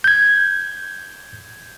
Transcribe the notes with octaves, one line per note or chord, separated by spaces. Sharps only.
G6 G#6